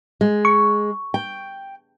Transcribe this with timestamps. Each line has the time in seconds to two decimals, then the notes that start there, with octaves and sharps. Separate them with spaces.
0.21 G#3
0.45 C#6
1.14 G5